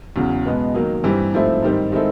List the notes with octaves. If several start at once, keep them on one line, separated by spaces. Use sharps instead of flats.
E2 C#3 F#3
B2 G#3 B3
D#3 F#3 A#3 D#4
G2 E3 G3 C4
G#2 F3 A3 C4 E4
G#2 D#3 G3 C4
D#3 G#3 C4 E4 A4